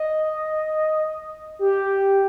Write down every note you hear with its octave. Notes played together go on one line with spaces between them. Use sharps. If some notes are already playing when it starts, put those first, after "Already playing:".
Already playing: D#5
G4